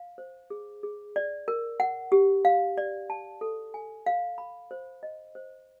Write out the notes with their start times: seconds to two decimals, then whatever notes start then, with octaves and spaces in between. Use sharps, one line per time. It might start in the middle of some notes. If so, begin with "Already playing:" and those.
Already playing: F5
0.18 C5
0.50 G#4
0.83 G#4
1.16 D5
1.48 A#4
1.80 F#5
2.12 G4
2.45 F5
2.78 D5
3.10 A5
3.41 A4
3.74 G#5
4.06 F5
4.38 B5
4.71 C5
5.03 D#5
5.35 C5